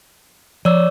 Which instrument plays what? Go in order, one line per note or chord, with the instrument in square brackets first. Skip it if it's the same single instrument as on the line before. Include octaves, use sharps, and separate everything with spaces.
[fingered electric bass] F3 [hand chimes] C#5 D5 E6